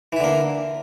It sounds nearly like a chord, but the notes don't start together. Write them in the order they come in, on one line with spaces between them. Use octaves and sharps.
E3 E4 D3 A#3